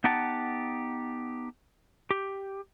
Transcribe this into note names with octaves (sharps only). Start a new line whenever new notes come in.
B3 D#4 G4 F#5 A5
G4